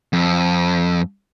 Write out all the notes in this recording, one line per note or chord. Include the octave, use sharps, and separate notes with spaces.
F2